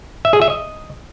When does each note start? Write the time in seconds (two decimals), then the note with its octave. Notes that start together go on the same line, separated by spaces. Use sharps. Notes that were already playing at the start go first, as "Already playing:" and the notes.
0.25 E5
0.33 G#4
0.42 E5
0.50 D#5